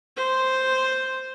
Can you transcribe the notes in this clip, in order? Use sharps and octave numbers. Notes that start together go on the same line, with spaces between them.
C5